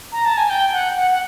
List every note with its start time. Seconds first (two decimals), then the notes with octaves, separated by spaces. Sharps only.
0.12 A#5
0.25 A5
0.37 G#5
0.50 G5
0.73 F#5
0.96 F#5
1.11 F#5